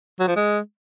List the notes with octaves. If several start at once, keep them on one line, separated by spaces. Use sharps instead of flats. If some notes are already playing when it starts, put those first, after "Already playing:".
F#3
F3
G#3